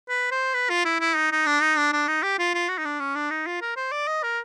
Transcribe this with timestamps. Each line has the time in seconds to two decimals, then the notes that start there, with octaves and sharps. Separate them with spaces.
0.09 B4
0.31 C5
0.54 B4
0.70 F4
0.85 E4
1.00 E4
1.16 D#4
1.32 D#4
1.46 D4
1.62 D#4
1.77 D4
1.93 D4
2.08 D#4
2.23 G4
2.39 F4
2.54 F4
2.69 F#4
2.78 D#4
2.85 D4
3.00 C#4
3.15 D4
3.31 D#4
3.46 F4
3.61 A#4
3.76 C5
3.92 D5
4.08 D#5
4.23 A#4